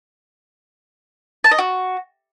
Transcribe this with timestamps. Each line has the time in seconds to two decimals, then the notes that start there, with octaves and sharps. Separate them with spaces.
1.44 A5
1.51 D#5
1.58 F#4